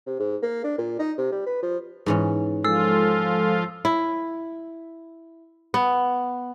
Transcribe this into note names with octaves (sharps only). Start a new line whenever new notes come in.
C3
G#2
A#3
D4
A#2
D#4
C3
G3
B4
F3
G#2 E3 C#4
F3 G#3 F4 A4 E6
E4
B3